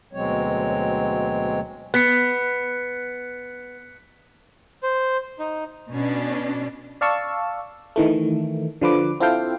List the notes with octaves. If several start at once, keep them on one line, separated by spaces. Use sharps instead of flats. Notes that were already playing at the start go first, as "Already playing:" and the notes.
D2 B2 F#3 G#3 C4 C#5
B3 F#6 B6 C#7
C5
D#4
B2 C#4 D4
D5 F5 A5 C#6 E6
D#3 E3 A3
D3 F3 B4 D6
C4 E4 F4 A4 F5 G5